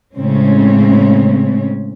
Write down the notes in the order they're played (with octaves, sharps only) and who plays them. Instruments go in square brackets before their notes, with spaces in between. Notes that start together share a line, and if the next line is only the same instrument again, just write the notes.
[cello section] A2 C#3 G#3 A3 C4 C#4